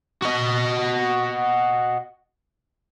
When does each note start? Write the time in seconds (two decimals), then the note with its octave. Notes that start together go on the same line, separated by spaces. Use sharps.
0.22 F#4 D#5